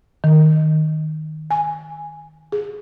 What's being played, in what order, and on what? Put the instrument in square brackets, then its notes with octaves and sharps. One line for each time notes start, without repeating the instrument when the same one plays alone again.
[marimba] D#3
G#5
G#4